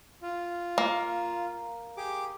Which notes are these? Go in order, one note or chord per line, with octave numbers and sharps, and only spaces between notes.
F4
A#3
G4 G#4 D6